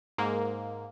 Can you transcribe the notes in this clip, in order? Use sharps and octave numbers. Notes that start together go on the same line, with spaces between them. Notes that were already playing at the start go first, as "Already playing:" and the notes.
G#2 A#3